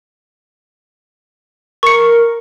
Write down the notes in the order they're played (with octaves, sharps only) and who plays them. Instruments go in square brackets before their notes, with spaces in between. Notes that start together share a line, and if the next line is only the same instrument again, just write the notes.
[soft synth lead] A#4 [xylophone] C#6 C#7